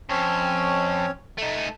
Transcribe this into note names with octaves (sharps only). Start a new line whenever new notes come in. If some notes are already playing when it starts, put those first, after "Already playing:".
F2 C4 C#4 C#5
A3 D#4